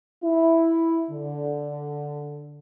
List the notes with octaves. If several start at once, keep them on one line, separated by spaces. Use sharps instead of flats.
E4
D3